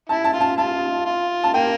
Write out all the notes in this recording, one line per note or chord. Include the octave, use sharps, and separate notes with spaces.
E4 A5
A5
F4
A5
F4 A5
F4
A5
A#3 G5